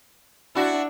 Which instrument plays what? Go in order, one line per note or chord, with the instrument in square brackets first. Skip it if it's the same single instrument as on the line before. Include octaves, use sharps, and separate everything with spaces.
[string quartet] D4 [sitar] E4 F#4